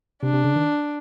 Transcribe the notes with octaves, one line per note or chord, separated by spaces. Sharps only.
C3 D4
C3
C#3
D#3